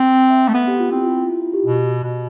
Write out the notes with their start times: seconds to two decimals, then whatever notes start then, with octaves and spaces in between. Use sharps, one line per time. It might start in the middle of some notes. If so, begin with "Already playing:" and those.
Already playing: C4
0.18 G5
0.30 E5
0.42 G5
0.48 A3
0.54 B3 A4
0.67 G4
0.80 F4
0.91 C4 E4
1.04 F4
1.16 F4
1.29 E4
1.41 F4
1.53 G4
1.66 B2
2.03 B2